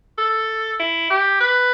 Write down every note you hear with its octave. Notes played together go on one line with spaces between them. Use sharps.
A4
E4
G4
B4